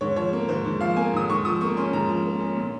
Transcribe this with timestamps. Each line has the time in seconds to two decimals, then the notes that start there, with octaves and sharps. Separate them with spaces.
0.01 G#2 C#5
0.16 F3 C#5
0.33 A#3
0.48 G#2 C5
0.66 G#2
0.81 F3 F5
0.96 A#3 G#5
1.13 G#2 D#6
1.29 G#2 C#6
1.45 F3 D#6
1.61 A#3 C#6
1.77 C#4 C6
1.93 G#2 A#5
2.09 F3
2.25 A#3
2.40 C#4
2.57 A#2